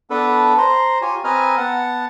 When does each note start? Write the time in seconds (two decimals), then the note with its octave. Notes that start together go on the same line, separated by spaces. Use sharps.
0.10 B3 D4 A4 B4
0.58 C5 A#5 C6
1.01 F4 G4 C#5 G#5
1.24 C4 B4 D#5 G#5 A#5 F6
1.57 B3 F#5 A5